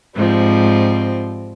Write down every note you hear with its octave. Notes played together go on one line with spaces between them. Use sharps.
G#2 F3 G3 C4